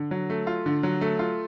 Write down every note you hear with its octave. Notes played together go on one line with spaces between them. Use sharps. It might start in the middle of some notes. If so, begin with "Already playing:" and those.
Already playing: D3
F#3
A3
F4
D3
F#3
A3
F4